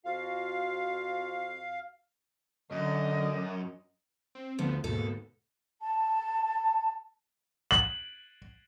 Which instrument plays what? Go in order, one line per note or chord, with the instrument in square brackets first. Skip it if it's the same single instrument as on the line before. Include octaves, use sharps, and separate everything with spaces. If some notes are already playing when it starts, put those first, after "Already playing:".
[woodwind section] F2 F4 F#4 [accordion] F5
[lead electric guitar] F#2 [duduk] D3 [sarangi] D#5
[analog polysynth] C4
[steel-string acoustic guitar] D2 [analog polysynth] F3 A3 B3
[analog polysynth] D#2 G#2 B2 [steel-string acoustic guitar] A4
[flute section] A5
[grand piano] F#7